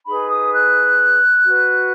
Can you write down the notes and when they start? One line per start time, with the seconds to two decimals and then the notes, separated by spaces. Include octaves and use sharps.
0.05 D#4 G#4 B4 B5
0.29 D#6
0.53 F#6
1.46 F#4 B4